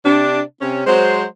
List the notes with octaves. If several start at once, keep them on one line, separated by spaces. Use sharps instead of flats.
C3 D4
C3 C#4
F#3 G#3 C5